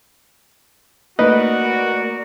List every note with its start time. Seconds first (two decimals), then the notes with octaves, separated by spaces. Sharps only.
1.19 A3 A#3 D#4 F#4 A#4 B4 D5 D#5